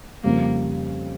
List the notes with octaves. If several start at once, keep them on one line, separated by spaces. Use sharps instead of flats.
F2 C#3 G3 A#3 C4